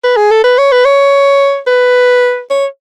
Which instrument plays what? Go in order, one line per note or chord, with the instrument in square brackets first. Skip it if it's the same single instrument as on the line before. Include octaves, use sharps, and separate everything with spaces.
[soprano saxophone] B4
G#4
A4
B4
C#5
B4
C#5
B4
C#5